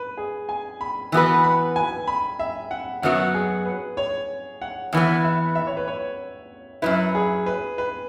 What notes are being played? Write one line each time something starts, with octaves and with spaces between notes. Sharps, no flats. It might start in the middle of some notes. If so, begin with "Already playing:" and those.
Already playing: B4
G#4
G#5
B5
E3 B3 F#4 B4
B5
G#5
B5
E5
F#5
F#2 F#3 B3 F#4 F#5
G#4
B4
C#5
F#5
E2 E3 B3 F#5
E5
E5
C#5
B4
C#5
F#2 F#3 E4 B4
G#4
B4
B4